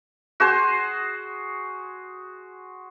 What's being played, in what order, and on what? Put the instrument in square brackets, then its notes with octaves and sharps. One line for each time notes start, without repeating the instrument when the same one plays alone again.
[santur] F#4 G#4 C5